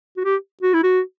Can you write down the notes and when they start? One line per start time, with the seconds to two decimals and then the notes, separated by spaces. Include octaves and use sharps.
0.17 F#4
0.24 G4
0.63 F#4
0.73 E4
0.83 F#4